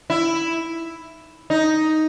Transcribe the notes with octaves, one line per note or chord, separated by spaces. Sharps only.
E4
D#4